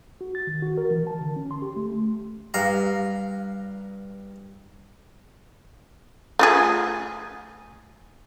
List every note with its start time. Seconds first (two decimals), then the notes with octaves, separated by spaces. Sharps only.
0.21 F#4
0.35 A6
0.47 D#3
0.62 F#4
0.77 A#4
0.91 E3
1.07 A5
1.21 D3
1.36 C#4
1.51 C6
1.62 G4
1.76 A3
2.54 G2 F5 A#5
6.39 A3 F4 G#4